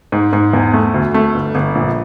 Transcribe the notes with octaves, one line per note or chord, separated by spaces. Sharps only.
G#2
G#2
E2
A3
D2
A3
G1
G1
A#1